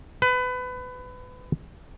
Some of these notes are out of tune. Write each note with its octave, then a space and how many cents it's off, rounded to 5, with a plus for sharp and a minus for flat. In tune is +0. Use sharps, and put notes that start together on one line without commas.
B4 +25